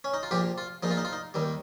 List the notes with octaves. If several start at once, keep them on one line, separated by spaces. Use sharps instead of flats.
C#4
D#4
F4
A#1 A#2 F3 G4
F4
A#1 A#2 F3 D#4
F4
D#4
F4
D#4
D#2 D#3 G3